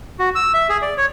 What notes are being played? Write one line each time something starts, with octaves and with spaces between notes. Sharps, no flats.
F#4
E6
E5
G#4
D5
C#5